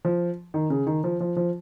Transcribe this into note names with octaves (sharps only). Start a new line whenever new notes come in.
F3
D#3
C#3
D#3
F3
F3
F3